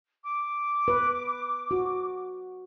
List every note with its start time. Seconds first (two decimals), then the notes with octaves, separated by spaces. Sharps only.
0.24 D6
0.88 B4
1.71 F#4